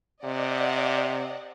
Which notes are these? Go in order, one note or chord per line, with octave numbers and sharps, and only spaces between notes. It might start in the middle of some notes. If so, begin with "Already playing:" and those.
C3 D5 D#5 F#5